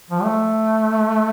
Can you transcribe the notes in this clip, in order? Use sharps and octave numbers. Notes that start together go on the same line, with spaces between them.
F3
A3